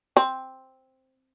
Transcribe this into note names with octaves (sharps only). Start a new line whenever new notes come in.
C4